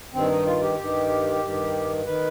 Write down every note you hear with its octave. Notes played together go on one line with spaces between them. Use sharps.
G2 D#3 C4
D#4
F4
G4
G2 D#3
G2 D#3
D#3 B4